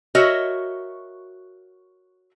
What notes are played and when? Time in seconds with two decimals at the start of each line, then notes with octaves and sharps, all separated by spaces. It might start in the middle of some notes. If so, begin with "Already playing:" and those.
0.15 F#4 A#4 C#5 D#5 E5